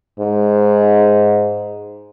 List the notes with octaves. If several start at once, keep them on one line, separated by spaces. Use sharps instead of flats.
G#2